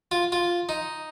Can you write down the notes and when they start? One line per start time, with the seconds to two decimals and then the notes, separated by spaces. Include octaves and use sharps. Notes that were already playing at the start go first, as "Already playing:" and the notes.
0.11 F4
0.32 F4
0.69 D#4